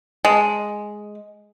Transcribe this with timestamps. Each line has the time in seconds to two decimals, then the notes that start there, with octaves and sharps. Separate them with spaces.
0.25 G#3